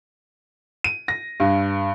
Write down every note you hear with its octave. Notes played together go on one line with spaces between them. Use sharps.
D#7
A#6
G2